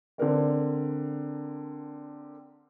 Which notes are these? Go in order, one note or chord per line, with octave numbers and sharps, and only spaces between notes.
D3 C4 A#4 D5